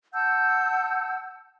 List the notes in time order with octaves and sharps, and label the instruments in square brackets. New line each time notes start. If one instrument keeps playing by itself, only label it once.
[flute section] F#5 A5 E6 G6